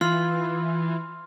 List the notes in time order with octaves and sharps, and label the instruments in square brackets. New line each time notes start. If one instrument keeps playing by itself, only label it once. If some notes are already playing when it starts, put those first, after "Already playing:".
[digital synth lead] E3 [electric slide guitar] F4 [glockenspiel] C6 F6